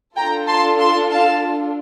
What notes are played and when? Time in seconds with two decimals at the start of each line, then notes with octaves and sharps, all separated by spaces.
0.16 D4 F4 A4 G5 A#5
0.47 A5 C6
0.79 A5 C6
1.10 F5 A5